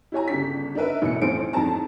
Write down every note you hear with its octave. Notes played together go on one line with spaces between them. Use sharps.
E4 G4 C#5 G#5 A#5
G1 C#3 D4 G4 B6
D4 D#4 A#4 B4 E5
A1 B2 C#7
A1 F2 F4 C5 D7
A1 F2 G#2 C4 A5 A#5